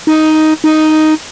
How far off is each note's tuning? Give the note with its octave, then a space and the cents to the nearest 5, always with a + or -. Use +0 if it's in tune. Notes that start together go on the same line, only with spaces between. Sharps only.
D#4 +5
D#4 +0